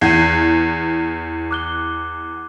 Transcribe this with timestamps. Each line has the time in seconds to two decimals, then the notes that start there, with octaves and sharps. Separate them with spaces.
0.01 E2 G6 G#6 C7
1.51 D6 F#6 G7